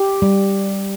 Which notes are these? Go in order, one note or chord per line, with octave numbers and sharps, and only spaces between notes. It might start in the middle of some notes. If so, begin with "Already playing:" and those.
Already playing: G4
G3